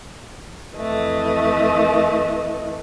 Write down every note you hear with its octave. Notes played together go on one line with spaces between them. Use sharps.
F2 E3 A3 D#5